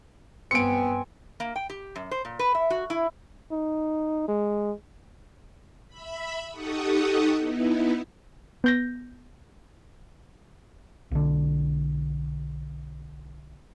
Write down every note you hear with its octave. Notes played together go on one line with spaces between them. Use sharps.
G2 B3 C4 G#5 C#7 D7
A#3
G5
G4
F#2
C5
A#2
B4
E5
F#4
E4
D#4
G#3
E5 B5
D#4 G4 A4 F#5 C#6 D#6
B3 D#4 E4
B3 G6 A#6
B1 D3